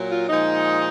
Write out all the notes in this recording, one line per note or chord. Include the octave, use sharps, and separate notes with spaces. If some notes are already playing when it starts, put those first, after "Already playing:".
Already playing: A#2 F#3
F4
A#2 F3 G#3 D#4